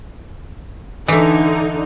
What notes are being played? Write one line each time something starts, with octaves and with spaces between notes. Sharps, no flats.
D3 E3 D#4 E4